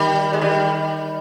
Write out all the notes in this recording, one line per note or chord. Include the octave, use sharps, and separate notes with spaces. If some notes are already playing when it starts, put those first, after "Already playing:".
Already playing: D#3 G3
G#3
D#3 G3